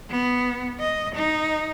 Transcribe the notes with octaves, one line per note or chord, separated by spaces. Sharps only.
B3
D#5
D#4